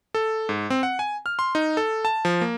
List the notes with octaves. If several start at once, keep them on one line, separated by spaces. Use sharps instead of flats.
A4
G#2
C4
F#5
G#5
F6
C6
D#4
A4
A5
F3
A#3